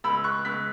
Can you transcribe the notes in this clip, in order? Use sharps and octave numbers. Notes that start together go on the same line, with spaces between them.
C#2 B5 E6
C#6 F#6
C#2 F#6 B6